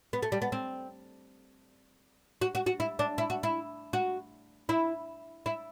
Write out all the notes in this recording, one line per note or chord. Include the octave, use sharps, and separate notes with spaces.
B3
A3
G3
B3
C4
F#4
F#4
F#4
E4
D4
E4
F#4
E4
F#4
E4
E4